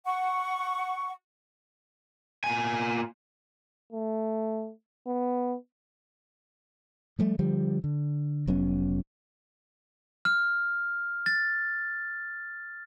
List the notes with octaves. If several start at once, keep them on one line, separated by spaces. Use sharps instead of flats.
F#5 C#6
A#2 G#5
A3
B3
F3 G3 A3
D3 F3 G3
D3
F1 F#3 B3 C#4
F6
A6